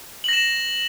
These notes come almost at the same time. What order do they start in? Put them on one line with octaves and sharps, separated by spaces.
F#7 A#6 E7